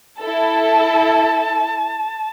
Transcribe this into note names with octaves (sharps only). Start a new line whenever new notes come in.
E4 A4 A5